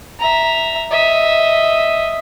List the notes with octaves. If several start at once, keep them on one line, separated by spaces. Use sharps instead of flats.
E5 A#5
D#5 E5